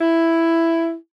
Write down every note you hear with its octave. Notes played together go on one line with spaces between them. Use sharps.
E4